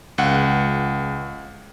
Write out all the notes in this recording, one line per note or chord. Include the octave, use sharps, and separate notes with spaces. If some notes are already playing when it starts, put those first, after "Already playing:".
C#2 F#5